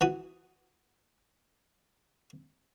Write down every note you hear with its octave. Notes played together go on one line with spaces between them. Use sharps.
E3 F#4 D#6